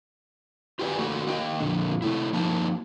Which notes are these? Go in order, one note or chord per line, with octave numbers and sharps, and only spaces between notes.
F4 G4 G#4 B4 D5 G#5
A3 A#3 F#4
A#3 D#5 G5
F2 A#2 D3
C3 A3 E4
F3 A#3 D#4 A5